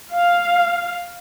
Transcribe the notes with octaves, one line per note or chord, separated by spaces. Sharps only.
F5